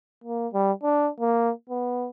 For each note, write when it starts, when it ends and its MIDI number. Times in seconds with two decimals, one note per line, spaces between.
0.24 0.48 58
0.53 0.72 55
0.83 1.09 62
1.20 1.51 58
1.70 2.09 59